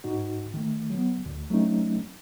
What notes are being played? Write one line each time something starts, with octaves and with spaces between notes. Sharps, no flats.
G#2 D#4 F#4
D#3 A3
F#3 B3
D2
F#3 A3 C4 C#4 D#4